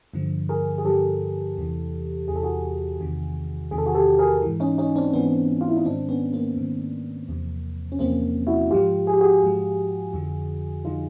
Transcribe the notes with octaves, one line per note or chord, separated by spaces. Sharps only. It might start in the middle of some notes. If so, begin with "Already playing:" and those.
G2 D3 F3
G#4 A#4
G#4
G2 D3 F3 G4 A4
E2 C3 E3
E2 C3 E3 G#4
A4
F#4 G#4
E2 C3 D#3
E2 C3 D#3 G#4
A4
F#4 G#4
G4 A4
G#4 A#4
G#2 E3
C#4 D#4
C#4 D#4
C4 D4
G#2 E3 B3 C#4
F4
E4
D#4
G#2 D#3 C4 D4
B3 C#4
A#3 C4
G#2 D#3
E2 C3 F3
C#4
E2 C3 F3 A#3 C4
E4 F#4
G#2 F3 F4 G4
G#4
G4
F#4 G#4
G#2 F3
F2 D3 F3
D3 F3 D#4 F4